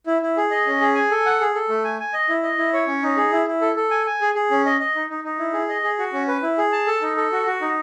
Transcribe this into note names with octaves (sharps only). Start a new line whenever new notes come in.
E4
E4
G#4
D#5
C#4
G#4
G#5
A4
F#5
G#4
A4
A3
G#5
G#5
D#5
E4
D#5
E4
C#5
C#4
D#4
G#4
E4
E4
A4
A4
G#5
G#5
G#4
G#4
C#4
D#5
D#5
D#4
D#4
D#4
E4
G#4
D#5
G#4
F#4
C#4
B4
E4
G#4
A5
A4
D#4
A4
F#4
F#4
D#4